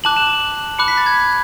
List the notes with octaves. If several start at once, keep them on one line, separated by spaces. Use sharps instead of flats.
A5 D6 F#6 F#7
E7
B5 D6 F#6 C#7
B6
A6
G#6